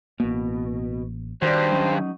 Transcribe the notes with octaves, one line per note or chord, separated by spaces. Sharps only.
A1 B2 A#3
G2 D#3 F#4 B4 C5 D5
F#3 C#4 D#4